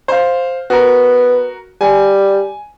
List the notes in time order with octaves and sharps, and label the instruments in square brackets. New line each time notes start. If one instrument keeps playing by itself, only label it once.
[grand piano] C5 F5
[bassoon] B3 [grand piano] F#4 A#4
[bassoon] G3 [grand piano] G#5